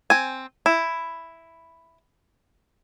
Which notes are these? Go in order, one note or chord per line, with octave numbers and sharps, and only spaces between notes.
C4 G#5
E4